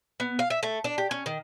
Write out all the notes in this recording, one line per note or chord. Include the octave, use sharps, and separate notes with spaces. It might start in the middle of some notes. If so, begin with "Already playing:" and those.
B3
F5
E5
A3
D4
G4
C#4
D#3